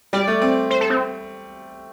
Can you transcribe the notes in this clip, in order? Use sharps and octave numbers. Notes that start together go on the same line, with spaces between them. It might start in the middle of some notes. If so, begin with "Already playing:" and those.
G3 D5
A3
C4
C5
A4
C4